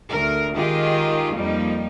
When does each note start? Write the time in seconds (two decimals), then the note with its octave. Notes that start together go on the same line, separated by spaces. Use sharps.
0.10 D2 A#4
0.56 D#3 G#3 F4 G4 G#4 D#5
1.35 F2 F3 G3 A#3 D#4